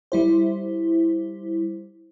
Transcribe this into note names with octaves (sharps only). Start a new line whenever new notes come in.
G3 E4 C5